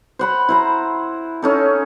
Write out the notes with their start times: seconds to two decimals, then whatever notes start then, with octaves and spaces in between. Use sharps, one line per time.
0.19 C5 F#5 B5
0.49 E4 C5 A#5
1.42 C#4 D#4 A4